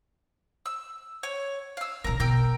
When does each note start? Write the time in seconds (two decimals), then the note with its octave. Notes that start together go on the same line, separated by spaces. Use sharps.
0.66 E6
1.23 C#5
1.77 F5 E6
2.04 D#2 A#2 A#4 A#5
2.20 B2 A#4 G5 E6